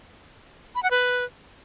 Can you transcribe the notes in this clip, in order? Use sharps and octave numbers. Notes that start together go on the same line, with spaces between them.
B5
F#5
B4